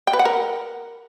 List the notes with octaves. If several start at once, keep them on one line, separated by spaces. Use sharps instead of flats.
G5
B4
F#5
A#4